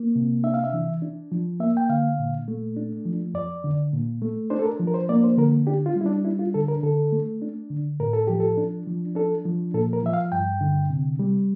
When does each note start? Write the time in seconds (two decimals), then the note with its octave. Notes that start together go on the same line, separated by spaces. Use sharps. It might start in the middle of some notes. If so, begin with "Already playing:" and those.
Already playing: A#3
0.15 C3
0.44 D4 E5
0.54 F5
0.64 E5
0.73 E3
1.02 D4
1.32 F3
1.60 A#3 E5
1.77 G5
1.89 D3 F5
2.19 A#2
2.48 A3
2.77 D4
3.05 F3
3.34 F2 D5
3.64 D3
3.93 A#2
4.22 A3
4.50 D4 C5
4.59 A4
4.66 A#4
4.80 F3
4.87 A#4
4.94 C5
5.09 A#3 D5
5.24 C5
5.38 D3 A#4
5.67 D4 G4
5.86 F4
5.96 G3
6.01 E4
6.06 D4
6.25 D4 E4
6.39 F4
6.54 D3 A4
6.68 A#4
6.83 D3 A4
7.12 A3
7.42 D4
7.70 D3
8.00 A2 A#4
8.13 A4
8.27 F3 G4
8.40 A4
8.57 D4
8.87 F3
9.15 D4 A4
9.45 F3
9.74 A#2 A4
9.93 A#4
10.03 F3 E5
10.13 F5
10.32 G2 G5
10.61 D3
10.90 C3
11.19 G3